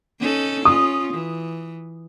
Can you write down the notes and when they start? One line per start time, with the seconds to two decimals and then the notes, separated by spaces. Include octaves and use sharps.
0.19 C#4 D#4 A4
0.65 C#4 F4 D#6
1.14 E3